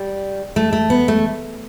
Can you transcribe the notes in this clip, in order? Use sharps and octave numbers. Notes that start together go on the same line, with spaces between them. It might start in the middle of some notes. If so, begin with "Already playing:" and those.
Already playing: G3
A3
A3
B3
A3